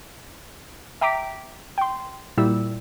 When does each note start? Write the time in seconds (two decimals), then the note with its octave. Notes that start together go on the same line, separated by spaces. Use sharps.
1.01 E5 G5 A#5 D6 B6 D7
1.78 G5 C6
2.38 A#2 G3 E4 E6